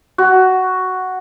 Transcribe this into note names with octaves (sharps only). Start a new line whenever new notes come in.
F#4